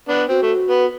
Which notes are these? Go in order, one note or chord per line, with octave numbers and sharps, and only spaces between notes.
B3 D4
C4 F#4
A3
B3